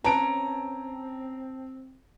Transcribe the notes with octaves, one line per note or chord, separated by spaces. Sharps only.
C4 C#4 B4 A5 A#5 D7